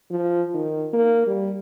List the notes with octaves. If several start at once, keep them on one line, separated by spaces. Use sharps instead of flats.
F3
D#3
A#3
G3